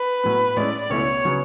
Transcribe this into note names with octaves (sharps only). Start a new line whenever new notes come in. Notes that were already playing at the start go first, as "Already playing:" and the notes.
Already playing: B4
A2 F#3 B3
A2 G#3 C#4 E4 D5
C#2 B2 A3 C#4 E4 C#5
C#3 F#3 B3